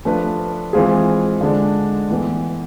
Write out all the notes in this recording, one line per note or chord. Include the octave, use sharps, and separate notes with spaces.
F3 A3 D4 F4 B4
E3 G#3 C4 F4 G#4
D3 G#3 D4
A2 E3 B3